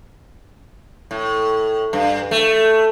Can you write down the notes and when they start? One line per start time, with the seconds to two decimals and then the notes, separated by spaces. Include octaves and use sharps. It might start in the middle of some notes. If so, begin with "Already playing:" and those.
1.11 A2
1.93 G2
2.31 A3